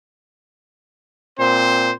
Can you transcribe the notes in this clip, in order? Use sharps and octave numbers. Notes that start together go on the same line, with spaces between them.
A#2 C4 C5